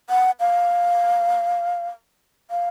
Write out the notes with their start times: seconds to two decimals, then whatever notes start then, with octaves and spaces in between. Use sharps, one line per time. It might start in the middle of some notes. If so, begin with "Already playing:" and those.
0.10 F#5
0.40 F5
2.51 F5